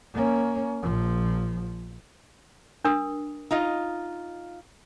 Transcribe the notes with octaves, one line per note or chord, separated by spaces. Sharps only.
A#3 C#4
A#1 F3
D4 A#4 D#6
D#4 F4 D#5